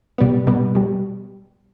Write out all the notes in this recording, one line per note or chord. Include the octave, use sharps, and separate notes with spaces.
B2 G3 B3
B2 G3 B3
B2 G3